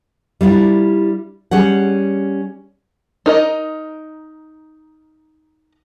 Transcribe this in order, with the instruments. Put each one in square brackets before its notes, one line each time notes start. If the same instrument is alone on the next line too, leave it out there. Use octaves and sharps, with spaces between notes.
[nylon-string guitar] G3 D4 E4 F4
G3 C#4 G#4 F#5
[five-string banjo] D#4 A#4 D#5